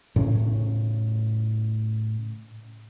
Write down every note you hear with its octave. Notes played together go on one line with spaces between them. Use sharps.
A2 C#3 C#4